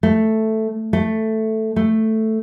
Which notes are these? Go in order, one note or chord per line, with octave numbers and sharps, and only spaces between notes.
A3
A3
A3